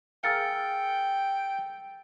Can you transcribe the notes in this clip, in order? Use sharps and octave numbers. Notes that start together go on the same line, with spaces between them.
G#4 A#4 F5 G5 E6 A6 C#7